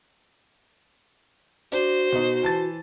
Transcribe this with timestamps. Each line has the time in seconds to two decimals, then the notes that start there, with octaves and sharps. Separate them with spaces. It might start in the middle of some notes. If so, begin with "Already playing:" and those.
1.72 D4 F#4 C5
2.12 B2 D#4
2.43 E3 A5 A6